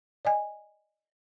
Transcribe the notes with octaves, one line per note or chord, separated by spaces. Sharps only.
D5 D#5 G#5